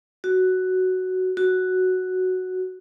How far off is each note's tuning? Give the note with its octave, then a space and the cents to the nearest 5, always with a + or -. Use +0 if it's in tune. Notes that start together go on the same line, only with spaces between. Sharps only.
F#4 +5
F#4 +0